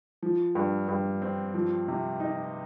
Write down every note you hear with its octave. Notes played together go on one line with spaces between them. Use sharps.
F3
G2
G2
C4
F3
C3
D#4